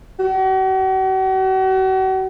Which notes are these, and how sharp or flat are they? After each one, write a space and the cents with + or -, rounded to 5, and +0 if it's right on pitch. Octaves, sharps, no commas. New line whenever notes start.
F#4 +40